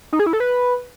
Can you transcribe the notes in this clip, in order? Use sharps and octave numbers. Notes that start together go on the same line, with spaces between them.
D#4
G#4
E4
A4
B4